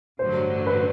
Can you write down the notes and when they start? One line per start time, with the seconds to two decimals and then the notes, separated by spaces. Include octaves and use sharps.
0.19 A1 G2 D3 F#3 C5
0.67 B4